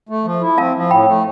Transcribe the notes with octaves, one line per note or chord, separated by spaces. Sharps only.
A3
F3
E4
C4 F5 A5
F3
A2 G5 B5
A3